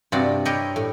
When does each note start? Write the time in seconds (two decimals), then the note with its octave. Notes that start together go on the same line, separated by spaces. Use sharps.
0.12 G2 C3 C4 F4 F#4 D5
0.45 E4 G4 A#4 C#5 D#5
0.76 A2